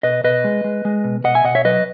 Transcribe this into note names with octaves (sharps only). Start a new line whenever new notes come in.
B2 B4 D#5
B2 B4 D#5
G#3
G#3
G#3
B2
B2 D#5 F#5
E5 G#5
B2 D#5 F#5
C#5 E5
F#3 B4 D#5